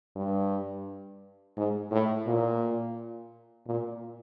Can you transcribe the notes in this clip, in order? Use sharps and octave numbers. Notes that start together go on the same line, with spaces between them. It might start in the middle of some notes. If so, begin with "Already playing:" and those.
G2
G#2
A2
A#2
A#2